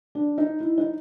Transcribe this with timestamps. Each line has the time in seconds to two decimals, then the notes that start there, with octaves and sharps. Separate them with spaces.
0.15 D4
0.38 D#4
0.60 E4
0.78 D#4